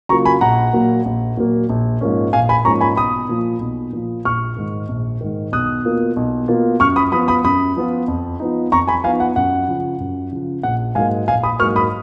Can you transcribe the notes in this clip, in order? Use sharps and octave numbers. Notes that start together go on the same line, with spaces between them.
C#3 F#3 A#3 F4 A#5 C#6
G#5 B5
A#1 F#5 A#5
A#2 F#3 A#3
A#1
A#2 F#3 A#3
A#1
G#2 F3 A#3 C#4
A#1 F5 G#5
G#5 B5
G#2 F3 A#3 C#4 A#5 C#6
G#5 B5
B1 B5 D#6
A#2 F3
B1
A#2 F3
A#1 C#6 F6
G#2 D#3
A#1
G#2 D#3
B1 D#6 F#6
B2 A#3 F4
B1
B2 A#3 F4
F#2 C#6 F6
B5 D#6
F3 B3 F4 B5 D#6
B5 D#6
F#2 B5 D#6
F3 B3 F4
F2
F3 B3 D#4
F2 A#5 C#6
G#5 B5
F3 B3 D#4 F5 G#5
F#5
F#2 F#5
C#3 F3
F#2
C#3 F3
A#1 F#5
G#2 F#3 A#3 F5 G#5
A#1 F5 G#5
B5 D#6
G#2 F#3 A#3 C#6 F6
B5 D#6